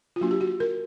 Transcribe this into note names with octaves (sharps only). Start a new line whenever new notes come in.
F4
F#3 A#3 D4 F#4
G4
F#4
A#4